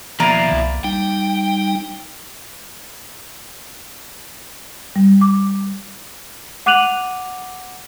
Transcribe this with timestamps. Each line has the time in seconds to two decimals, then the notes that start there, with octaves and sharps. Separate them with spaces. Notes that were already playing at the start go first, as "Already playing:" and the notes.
0.20 B2 D#3 F3 A#3 E4 D5 A#5
0.52 C2
0.84 G3 D#4 G5
4.96 G3
5.21 D6
6.66 F#5 D6 F#6 D#7 F7 F#7